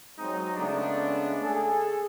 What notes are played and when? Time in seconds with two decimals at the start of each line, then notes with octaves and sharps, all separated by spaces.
0.19 F#3 G#3 C4 D#4
0.57 C#3 G#3 A3 B3 D4
1.42 G#4 A4